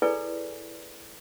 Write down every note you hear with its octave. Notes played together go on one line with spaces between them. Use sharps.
E4 G#4 A4 B4 D5 G#5